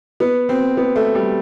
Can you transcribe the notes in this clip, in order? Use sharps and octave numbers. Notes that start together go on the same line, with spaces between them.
B3
C4
B3
A3
G3